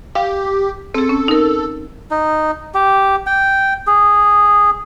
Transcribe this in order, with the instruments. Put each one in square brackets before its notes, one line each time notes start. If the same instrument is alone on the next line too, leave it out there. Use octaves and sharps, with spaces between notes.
[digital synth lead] G4 [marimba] F5
[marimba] C4 G#4 [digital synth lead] A4
[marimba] C#4
D#4 A#4
[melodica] D#4
G4
G5
G#4